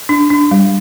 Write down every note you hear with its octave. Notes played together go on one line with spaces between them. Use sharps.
D4
D4
G3